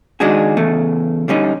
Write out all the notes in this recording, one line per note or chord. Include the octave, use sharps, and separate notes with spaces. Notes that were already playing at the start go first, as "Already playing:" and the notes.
D#3 G#3 D4 D#4 F#4 G#4
E2 C#3 A3
D3 G3 C#4 D#4